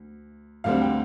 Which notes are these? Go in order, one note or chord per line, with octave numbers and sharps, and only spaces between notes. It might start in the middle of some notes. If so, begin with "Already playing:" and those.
Already playing: D2
D2 D3 G3 C4 F5
G5